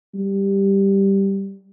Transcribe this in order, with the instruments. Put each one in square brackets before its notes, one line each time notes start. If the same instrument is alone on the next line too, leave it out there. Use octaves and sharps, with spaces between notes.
[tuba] G3